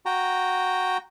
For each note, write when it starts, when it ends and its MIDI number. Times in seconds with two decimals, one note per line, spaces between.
0.06 0.98 66
0.06 0.98 79
0.06 0.98 82